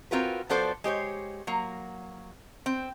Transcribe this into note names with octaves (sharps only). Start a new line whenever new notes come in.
C4 F4 F#4 A#4 B4
F3 B3 F#4 A4 C5 D5
G#3 G4 C5 C#5
F#3 A#3
C4